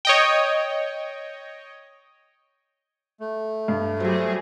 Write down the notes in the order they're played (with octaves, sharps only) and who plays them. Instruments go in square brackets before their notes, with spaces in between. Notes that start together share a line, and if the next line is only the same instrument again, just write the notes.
[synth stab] C#5 D#5 G5
[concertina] A3
[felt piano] G2
[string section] F#3 G3 G#4 [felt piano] C5 E5